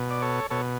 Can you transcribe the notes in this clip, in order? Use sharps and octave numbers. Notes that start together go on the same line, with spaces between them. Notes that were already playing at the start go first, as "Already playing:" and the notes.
Already playing: B2
D5
A4 C#5
B2 A4 C#5